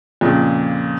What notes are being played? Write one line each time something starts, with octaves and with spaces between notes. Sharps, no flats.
F2 A#2 C#3